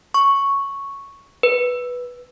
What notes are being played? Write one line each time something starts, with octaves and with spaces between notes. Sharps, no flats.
C#6
B4